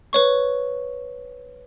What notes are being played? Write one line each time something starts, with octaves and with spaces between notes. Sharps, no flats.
B4 C#5 C#6